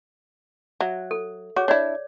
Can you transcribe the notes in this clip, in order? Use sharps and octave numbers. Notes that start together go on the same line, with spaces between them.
F#3 E5
A4
F#4 G#4 C#5 D6
D4 E4 C#5 D5